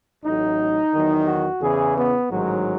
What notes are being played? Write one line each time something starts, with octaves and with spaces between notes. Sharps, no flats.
A1 A2 F#3 D#4
E2 D#3 F#3
F#4
E2 C#3 E3 G#4
B3
A1 G#2 D#3 F#3